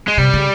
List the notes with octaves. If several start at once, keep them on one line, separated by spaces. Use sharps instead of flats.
G#3
C3 G3
C#3